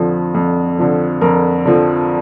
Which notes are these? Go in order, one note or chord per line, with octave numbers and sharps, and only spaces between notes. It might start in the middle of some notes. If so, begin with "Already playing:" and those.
Already playing: F2 D3 F3
F2
D3 F3
F2 A#4
D3 F3